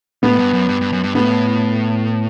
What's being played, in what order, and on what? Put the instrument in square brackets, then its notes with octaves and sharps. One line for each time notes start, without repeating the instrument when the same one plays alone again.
[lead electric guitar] A2 [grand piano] B3
[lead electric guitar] G2
F#2
G2
G2
F#2
G2
[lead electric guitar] A2 [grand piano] B3